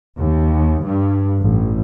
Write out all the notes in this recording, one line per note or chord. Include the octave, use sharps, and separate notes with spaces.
D#2
G2
A1